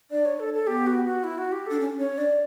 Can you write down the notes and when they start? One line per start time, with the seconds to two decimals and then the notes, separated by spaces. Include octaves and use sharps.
0.11 D4 D5
0.25 C#5
0.40 A4
0.54 A4
0.67 B3 G4
0.87 F#4
1.05 F#4
1.24 E4
1.38 F#4
1.52 G4
1.67 D4 A4
1.80 C#4
1.99 C#4 C#5
2.18 D4 D5